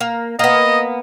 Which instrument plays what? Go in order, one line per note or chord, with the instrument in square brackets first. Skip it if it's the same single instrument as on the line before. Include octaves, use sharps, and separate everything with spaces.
[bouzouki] A#3
[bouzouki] A#3 B3 [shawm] D#5